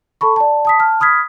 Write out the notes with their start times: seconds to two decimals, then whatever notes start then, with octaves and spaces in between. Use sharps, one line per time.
0.21 A4 A5 B5 C#6
0.36 D5 A5
0.65 A5 D#6 B6
0.79 A5 F6
1.00 B5 D#6 F6 G#6 B6